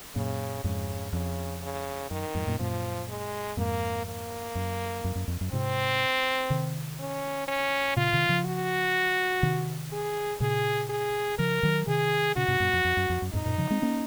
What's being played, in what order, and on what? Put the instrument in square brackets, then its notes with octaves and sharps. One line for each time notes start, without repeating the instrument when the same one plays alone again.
[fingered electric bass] F#2 A#2 [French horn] C#3
[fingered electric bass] F2 G#2 [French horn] C#3
[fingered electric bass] F2 [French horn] C#3
[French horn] C#3
[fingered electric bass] F#2 [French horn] D#3
[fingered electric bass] F2 G#2
F#2 A#2
[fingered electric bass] F#2 A#2 [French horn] F3
[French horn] G#3
[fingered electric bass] F2 G#2 [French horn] A#3
[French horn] A#3
[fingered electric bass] F#2
F#2
F#2
F2
F#2
[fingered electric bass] G#2 C3 [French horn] C4
[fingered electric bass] C3 D#3
[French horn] C#4
C#4
[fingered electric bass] A#2 C#3 [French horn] F4
[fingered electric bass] C3 D#3
C#3 F3
[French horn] F#4
[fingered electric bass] C3 D#3
[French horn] G#4
[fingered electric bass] A#2 C#3 [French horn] G#4
[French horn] G#4
[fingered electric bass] C#3 F3 [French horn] A#4
[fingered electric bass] D#3 F#3
[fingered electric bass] C3 D#3 [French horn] G#4
[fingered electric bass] A#2 C#3 [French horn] F#4
[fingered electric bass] G#2 C3
F#2 A#2
F2
F2
F#2
F2
F#2
[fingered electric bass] F2 G#2 [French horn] D#4
[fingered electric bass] F#2 A#2
C#3 F3
G#3 C4
A#3 C#4